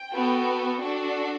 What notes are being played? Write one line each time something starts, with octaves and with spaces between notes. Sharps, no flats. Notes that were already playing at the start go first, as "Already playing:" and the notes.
Already playing: G5
B3 F#4 A4
D4 F#4 A4